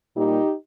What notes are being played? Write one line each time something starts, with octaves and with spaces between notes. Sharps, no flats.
A#2 G3 A#3 D#4 G4